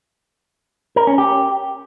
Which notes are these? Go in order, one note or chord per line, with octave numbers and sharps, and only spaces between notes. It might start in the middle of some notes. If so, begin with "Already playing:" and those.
A#4
C#4
G4